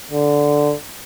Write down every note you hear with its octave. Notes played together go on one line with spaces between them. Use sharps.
D3